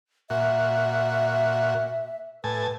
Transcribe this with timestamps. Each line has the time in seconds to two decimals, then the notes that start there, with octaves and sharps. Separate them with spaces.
0.30 A#2 F#4 E5
2.44 A2 B4 G#5 A5